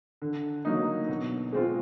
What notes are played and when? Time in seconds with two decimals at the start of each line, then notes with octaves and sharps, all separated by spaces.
0.22 D3
0.65 F#3 A#3 D#4
1.09 B2
1.53 G#3 C4 F4